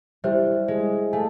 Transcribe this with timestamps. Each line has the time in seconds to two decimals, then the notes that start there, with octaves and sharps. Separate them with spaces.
0.24 G3 E4 G4 C5 E5
0.68 G#3
1.13 A3 F5 G#5